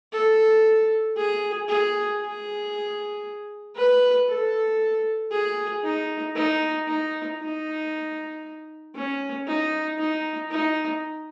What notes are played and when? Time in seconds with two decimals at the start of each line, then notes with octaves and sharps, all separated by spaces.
0.13 A4
1.17 G#4
1.68 G#4
2.20 G#4
3.76 B4
4.28 A4
5.31 G#4
5.84 D#4
6.36 D#4
6.87 D#4
7.40 D#4
8.95 C#4
9.48 D#4
9.99 D#4
10.51 D#4